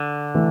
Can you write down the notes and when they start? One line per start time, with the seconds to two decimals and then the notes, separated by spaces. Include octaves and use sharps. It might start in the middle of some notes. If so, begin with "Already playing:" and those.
Already playing: D3
0.35 E3 A3